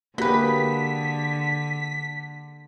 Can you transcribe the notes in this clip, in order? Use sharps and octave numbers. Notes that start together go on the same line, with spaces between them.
D3 F#3 A#3 G4 G#4 B4 B6